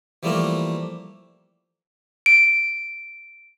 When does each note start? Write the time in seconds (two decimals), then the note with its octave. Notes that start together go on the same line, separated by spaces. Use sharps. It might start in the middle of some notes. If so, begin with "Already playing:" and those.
0.23 E3 F3 G3 A3 A#3 A#4
2.26 D7